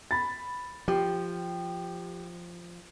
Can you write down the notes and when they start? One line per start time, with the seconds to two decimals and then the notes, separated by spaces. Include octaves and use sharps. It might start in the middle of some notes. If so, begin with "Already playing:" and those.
0.11 B5 A6
0.88 F3 G4